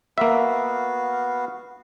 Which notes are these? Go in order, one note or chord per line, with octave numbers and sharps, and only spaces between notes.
A#3 B3 F#4 E5 F5